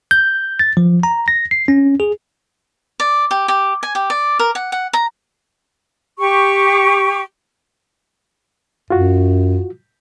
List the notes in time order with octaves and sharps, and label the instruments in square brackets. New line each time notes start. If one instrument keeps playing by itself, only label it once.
[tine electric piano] G6
A6
F3
A#5
A#6
C7
C#4
G#4
[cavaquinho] D5
G4
G4
G#5
G4
D5
A#4
F#5
F#5
A#5
[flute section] G4 C#6
[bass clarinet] F#2 [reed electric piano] F4 F#4